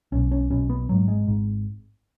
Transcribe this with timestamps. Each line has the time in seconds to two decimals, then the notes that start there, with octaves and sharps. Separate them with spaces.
0.12 B1 B2 C#4
0.31 C#4
0.50 B1 B2 C#4
0.70 B3
0.88 G#1 G#2 F#3
1.08 G#3
1.27 G#1 G#2